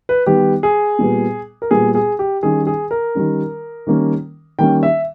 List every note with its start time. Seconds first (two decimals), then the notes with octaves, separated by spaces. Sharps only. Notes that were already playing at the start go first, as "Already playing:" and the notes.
0.09 B4
0.26 D#3 G3 B3 G4
0.63 G#4
0.99 A#2 G3 B3
1.62 A#4
1.71 A#2 G3 B3 G#4
1.95 G#4
2.19 G4
2.43 D#3 G3 C#4 G#4
2.67 G#4
2.91 A#4
3.15 D#3 G3 C#4
3.87 D#3 G3 A#3 C#4
4.59 D#3 G3 A#3 C#4 G5
4.83 E5